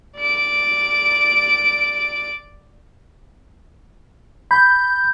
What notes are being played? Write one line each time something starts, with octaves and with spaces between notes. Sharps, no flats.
D5 D7
B5 G6